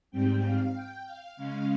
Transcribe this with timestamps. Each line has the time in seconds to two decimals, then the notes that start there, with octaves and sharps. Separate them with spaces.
0.11 G#2 G3 C4 G5
0.43 F5
0.74 G5
1.06 F5
1.37 C#3 G#3 C#4 F5